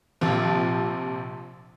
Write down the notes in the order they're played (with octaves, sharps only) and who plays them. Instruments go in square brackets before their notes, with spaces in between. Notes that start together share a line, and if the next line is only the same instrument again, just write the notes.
[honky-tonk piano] A#1 C3 F3